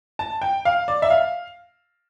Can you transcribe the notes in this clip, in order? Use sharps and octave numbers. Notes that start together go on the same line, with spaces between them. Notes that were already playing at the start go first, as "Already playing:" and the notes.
A5
G5
F5
D5
E5
F5